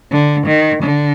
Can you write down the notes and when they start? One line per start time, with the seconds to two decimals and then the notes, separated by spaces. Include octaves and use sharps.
0.11 D3
0.47 D#3
0.83 D3